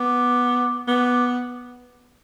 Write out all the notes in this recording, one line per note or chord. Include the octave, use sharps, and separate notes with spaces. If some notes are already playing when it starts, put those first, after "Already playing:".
Already playing: B3 D6
B3 D6
D6